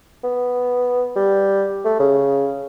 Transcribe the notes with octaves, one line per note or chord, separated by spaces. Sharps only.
B3
G3
A3
C#3